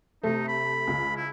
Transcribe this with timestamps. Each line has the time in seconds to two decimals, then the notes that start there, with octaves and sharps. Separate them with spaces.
0.23 C3 A3 D#4
0.48 B5
0.87 C#2
1.17 E4